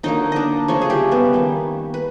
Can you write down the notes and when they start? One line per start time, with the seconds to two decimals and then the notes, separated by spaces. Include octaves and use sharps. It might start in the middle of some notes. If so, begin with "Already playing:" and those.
0.03 D3 F#3 A#3 D#4 D#5
0.32 D4 D5 D#5
0.68 C#3 F3 A3 C#4 C#5
0.82 G#4
0.90 G3 G4
1.11 B3 B4
1.33 D#3 G3 A#3
1.94 B4